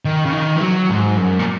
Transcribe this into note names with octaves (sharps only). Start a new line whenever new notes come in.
D#3
C#3
D#3
E3
F#3
G#2
F#2
A#2